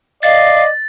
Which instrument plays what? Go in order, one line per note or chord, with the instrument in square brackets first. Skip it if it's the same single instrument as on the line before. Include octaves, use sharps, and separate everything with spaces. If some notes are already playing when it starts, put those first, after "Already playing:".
[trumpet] D5 [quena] D#5 [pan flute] F5 [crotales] A6